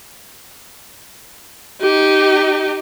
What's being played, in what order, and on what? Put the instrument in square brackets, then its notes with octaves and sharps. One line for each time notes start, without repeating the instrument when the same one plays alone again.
[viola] D#4 G4